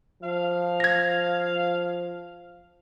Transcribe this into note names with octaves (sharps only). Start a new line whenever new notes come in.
F3 F5
G#6 A#6